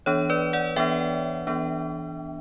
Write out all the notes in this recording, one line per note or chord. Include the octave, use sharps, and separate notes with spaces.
E3 B3 D4 C#5
B4 D5
D5 F#5
E3 B3 D4 E5 G5
E3 B3 D4